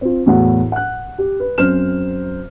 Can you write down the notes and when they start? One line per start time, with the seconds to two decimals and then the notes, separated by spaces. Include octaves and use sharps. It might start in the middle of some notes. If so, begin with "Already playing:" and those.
0.01 C4 F4
0.26 E2 A2 F#4 F#5
0.72 F#5 F#6
1.18 G4
1.40 B4
1.58 F#2 C4 C5 F6 E7